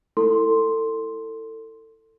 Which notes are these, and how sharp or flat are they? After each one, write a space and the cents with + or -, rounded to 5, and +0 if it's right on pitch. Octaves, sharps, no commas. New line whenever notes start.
E4 +0 A4 +25 C6 +0